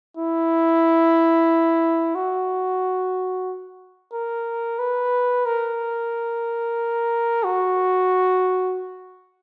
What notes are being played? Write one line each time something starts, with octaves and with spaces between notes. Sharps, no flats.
E4
F#4
A#4
B4
A#4
F#4